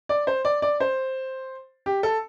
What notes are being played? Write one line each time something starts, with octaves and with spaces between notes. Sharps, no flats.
D5
C5
D5
D5
C5
G4
A4